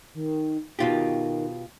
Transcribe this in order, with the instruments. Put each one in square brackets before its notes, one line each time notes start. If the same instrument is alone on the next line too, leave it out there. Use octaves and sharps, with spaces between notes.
[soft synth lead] D#3
[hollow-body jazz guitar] B2 F4 G4 [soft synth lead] D#3